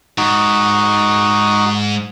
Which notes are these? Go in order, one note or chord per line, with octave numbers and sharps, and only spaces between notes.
G#2 D#4 F#4